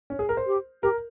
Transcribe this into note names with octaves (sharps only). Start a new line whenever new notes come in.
C#4
G#4
A#4
C5
G4
G4 A#4